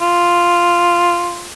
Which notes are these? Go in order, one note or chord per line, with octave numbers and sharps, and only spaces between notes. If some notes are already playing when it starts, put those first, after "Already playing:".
F4